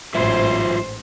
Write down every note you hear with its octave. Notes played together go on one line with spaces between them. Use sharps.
A1 G#2 F#3 F4 C5 E5